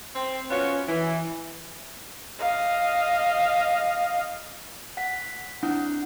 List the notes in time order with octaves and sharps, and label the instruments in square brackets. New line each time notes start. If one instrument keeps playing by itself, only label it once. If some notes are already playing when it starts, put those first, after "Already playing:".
[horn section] C4
B3 C#4 F4 F#4 C#5
E3
[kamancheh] D#5 F5
[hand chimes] F#5 B6
C4 D4 E4 F#5